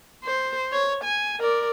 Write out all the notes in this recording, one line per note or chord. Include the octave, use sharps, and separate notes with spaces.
C5
C#5
G#5
A#4 D5